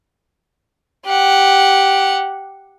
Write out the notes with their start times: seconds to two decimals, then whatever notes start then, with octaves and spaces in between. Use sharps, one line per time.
1.06 G4 F#5